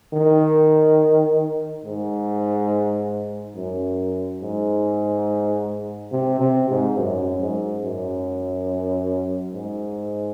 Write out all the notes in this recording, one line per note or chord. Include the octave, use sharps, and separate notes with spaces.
D#3
G#2
F#2
G#2
C3
C3
G#2
F#2
G#2
F#2
G#2